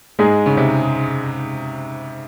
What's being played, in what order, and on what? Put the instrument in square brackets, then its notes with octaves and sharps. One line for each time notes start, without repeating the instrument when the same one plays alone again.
[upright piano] G#2 [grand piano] G#3 D#4 G#4
[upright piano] C#3
C3